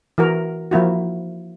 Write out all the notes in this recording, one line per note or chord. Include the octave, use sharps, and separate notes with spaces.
E3 F#4 A#4
F3 A#3 E4 F#4